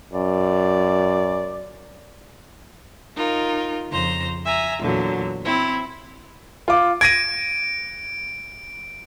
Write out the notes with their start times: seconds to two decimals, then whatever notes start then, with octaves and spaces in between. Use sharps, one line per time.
0.13 F#2 D5
3.15 D#4 F4 A#4
3.90 F2 C#3 C5 A#5 C6
4.44 E5 G#5 A#5
4.80 E2 A#2 D3 F#3
5.45 C4 E4 C#5
6.68 F4 D6
7.01 G#6 A#6 D7 D#7